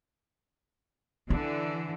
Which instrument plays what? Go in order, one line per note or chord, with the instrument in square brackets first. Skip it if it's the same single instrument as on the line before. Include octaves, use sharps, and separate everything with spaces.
[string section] D3 E3 [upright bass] E4